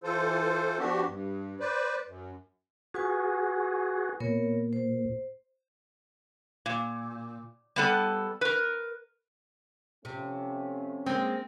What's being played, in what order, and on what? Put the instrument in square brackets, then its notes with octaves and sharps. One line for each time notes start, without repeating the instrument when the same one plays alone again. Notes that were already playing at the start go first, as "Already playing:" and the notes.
[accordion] E3 F4 A4 C5
F3 B3 D4 F#4 G4
G2
B4 C5 D5
F#2
[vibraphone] F4 B4 G#5 [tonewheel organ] F#4 G#4
[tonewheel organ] A#2 [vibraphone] B3 A#4 C#5
[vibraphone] C5
[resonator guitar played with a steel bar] A#2
G3 B3 A4
A#4 B4
[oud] C3 [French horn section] F3 A3 C#4
[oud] G#3 A#3 [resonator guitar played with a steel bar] C4